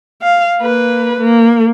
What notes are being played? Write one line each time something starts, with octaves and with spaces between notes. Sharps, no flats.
F5
A#3 B4
A#3